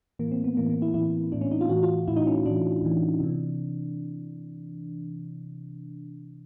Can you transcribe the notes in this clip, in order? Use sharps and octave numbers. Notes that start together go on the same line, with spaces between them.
A2 E3 A#3
C4
B3
A2 E3 A#3
A#3
E4
A2 E3 E4
A2 E3 D4
C#4
D#4
F4
A2 E3 F#4
F4
A2 E3 E4
D#4
C#4
A2 E3 D4
A2 E3
C3 E3